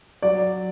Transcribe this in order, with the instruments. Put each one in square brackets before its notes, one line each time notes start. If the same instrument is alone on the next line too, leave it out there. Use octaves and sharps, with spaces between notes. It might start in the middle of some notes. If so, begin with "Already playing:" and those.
[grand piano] F#3 D5